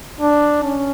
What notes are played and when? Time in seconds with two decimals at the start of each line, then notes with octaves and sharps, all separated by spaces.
0.21 D4
0.63 C#4